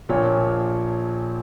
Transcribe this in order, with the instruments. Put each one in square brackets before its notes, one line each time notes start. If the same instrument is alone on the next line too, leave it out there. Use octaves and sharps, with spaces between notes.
[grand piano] A#1 A#2 F3 C#5